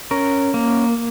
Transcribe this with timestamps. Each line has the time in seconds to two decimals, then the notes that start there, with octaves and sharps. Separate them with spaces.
0.11 C#4 A#4
0.54 A#3